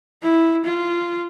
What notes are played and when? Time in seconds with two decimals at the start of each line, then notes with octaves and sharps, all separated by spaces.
0.23 E4
0.65 F4